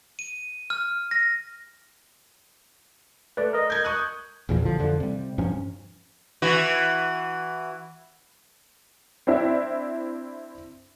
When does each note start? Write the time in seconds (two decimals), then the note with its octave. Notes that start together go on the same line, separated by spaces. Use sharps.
0.19 D#7
0.70 F6
1.11 A#6
3.37 A3 B4 D5
3.53 A#4 D#5
3.70 G6 G#6
3.84 C#6 D#6 F#6
4.49 A#1 E2 F3
4.62 D3 F3
4.79 F2 D3 F3
5.00 C3 G3
5.38 G2 F3 C#4
6.42 E3 F#4
9.27 C4 D4 E4 E5